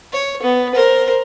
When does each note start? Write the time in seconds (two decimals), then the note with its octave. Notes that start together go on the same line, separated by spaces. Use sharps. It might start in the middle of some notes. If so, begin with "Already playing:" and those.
0.13 C#5
0.42 B3
0.74 A#4 C5